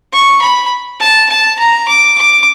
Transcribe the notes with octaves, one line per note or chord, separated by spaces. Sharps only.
C#6
B5
A5
A5
A#5
D6
D6